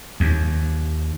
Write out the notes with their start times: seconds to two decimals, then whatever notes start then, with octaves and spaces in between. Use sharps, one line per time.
0.20 D#2